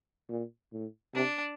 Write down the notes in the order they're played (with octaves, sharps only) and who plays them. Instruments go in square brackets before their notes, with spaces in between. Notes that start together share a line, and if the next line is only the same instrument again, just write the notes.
[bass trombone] A#2
A2
[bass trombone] C3 [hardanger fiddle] D4